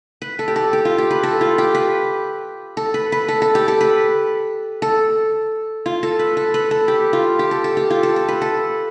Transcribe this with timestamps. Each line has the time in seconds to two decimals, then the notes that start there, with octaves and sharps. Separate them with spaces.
0.22 B4
0.39 A4
0.48 G4
0.56 A4
0.73 G4
0.85 F4
0.98 G4
1.11 B4
1.23 A4
1.41 F4
1.58 G4
1.75 B4
2.77 A4
2.94 B4
3.12 B4
3.28 A4
3.42 A4
3.55 G4
3.68 A4
3.81 B4
4.82 A4
5.86 F4
6.03 A4
6.19 B4
6.37 A4
6.54 B4
6.71 A4
6.88 G4
7.13 F4
7.39 G4
7.51 A4
7.64 A4
7.77 G4
7.90 F4
8.03 A4
8.16 A4
8.28 B4
8.42 A4